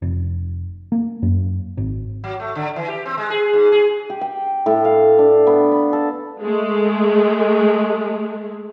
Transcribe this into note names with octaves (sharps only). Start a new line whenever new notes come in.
F1
A#3
F#2
G#1
F#3
A3
D3
E3
G4
C4
G#3
G#4
G#2
G#4
G4
G5
A2
F5
D4
B3
B5
A4
G#3 A3